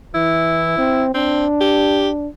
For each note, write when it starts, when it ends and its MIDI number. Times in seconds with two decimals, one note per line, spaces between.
0.14 0.73 52
0.14 1.04 64
0.78 1.12 60
1.15 1.46 60
1.15 2.28 62
1.61 2.09 67